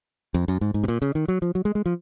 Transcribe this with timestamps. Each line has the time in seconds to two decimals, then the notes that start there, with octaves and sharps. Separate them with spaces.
0.34 F2
0.48 F#2
0.61 G#2
0.74 G#2
0.84 C3
0.88 A#2
1.02 C#3
1.15 D#3
1.28 F#3
1.42 F3
1.55 F#3
1.65 G#3
1.75 G#3
1.86 F3